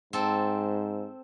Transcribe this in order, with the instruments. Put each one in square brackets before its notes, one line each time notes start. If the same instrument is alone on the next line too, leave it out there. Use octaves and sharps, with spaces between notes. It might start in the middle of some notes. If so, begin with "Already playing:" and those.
[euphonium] G#2 [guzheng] C4 A4